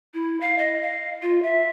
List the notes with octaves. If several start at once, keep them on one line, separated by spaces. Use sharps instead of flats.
E4
F5
D#5
F5
F4
E5